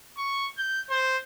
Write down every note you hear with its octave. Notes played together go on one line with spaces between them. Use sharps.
C#6
G6
C5